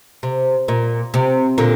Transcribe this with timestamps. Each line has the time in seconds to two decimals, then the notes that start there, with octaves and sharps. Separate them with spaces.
0.23 C3
0.68 A#2
1.14 C3
1.58 A#2 D3